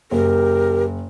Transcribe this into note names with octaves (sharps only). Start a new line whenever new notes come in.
F#1 G4 A#4